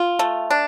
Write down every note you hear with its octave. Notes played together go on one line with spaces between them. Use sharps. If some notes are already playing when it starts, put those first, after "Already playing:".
Already playing: F4
A3
D4